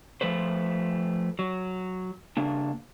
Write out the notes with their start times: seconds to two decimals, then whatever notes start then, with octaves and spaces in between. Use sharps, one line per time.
0.21 F3 A3 B4 C5
1.39 F#3
2.37 C#3 A#3 D4